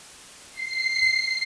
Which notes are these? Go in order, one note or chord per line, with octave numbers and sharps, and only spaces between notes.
C7